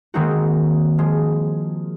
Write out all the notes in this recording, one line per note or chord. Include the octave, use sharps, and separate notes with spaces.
D#3 G#3 A#3 C4 D#4 F#4
F3 G#3